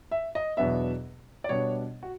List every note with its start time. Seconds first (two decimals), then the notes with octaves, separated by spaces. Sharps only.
0.11 E5
0.35 D#5
0.57 E2 B2 F#3 B3 D4 E5
1.44 D5
1.49 B2 G3 B3 D4 C#5
2.03 F#4